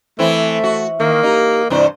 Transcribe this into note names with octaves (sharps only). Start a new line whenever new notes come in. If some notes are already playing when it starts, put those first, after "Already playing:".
E3 A3 C4 E4 E5
F#4
D#3 A#3
D#4 G4
G2 C3 E3 C5 D5